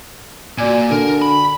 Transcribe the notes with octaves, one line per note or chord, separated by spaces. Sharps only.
A#2 F#4 D5 G#5
D3 A#4
B5